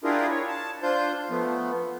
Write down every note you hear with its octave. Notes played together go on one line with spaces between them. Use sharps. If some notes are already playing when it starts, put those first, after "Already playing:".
D4 E4 F4 G4 G#4 A#4
C#5
A5
D4 F4 C5 G6
F3 A3 B3